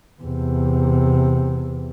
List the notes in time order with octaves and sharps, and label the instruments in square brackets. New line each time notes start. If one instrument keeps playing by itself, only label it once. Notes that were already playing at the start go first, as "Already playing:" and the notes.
[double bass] E2 C3